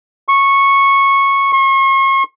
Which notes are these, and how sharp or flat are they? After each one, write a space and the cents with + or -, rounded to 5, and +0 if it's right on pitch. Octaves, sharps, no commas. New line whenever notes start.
C#6 -10
C#6 -40